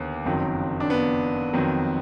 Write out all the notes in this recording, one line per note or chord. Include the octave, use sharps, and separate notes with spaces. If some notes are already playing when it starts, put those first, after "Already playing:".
Already playing: D#2 D3 B3
F#1 F2 D#3 F#3
D4
B3
F2 D#3 F#3